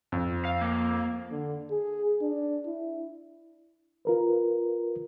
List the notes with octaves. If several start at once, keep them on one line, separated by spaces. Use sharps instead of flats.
F2
F5
A#3
D3
G#4
D4
E4
F4 A#4 B4